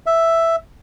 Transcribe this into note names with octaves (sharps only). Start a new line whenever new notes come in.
E5